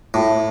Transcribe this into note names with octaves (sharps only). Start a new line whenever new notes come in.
A2